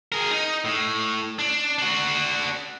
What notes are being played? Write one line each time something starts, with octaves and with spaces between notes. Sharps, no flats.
G#4 A#4
D#4
A2
D4
D4 F#4